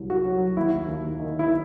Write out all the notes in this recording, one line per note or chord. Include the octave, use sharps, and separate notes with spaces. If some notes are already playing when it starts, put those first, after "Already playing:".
Already playing: C2 F#3
F#4
F#3
D#2 E4
D#2
D#3
E4